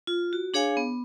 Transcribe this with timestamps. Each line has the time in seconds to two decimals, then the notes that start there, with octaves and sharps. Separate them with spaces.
0.07 F4
0.33 F#4
0.54 D4 G#4 C#5 F5 G#5
0.77 B3